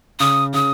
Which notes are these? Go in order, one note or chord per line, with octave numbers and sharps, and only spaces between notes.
C#3 D#6
C#3 D#6